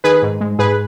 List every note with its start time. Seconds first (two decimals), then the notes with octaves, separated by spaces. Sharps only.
0.04 D#3 G#4 B4
0.22 G#2
0.41 G#3
0.59 G#2 G#4 B4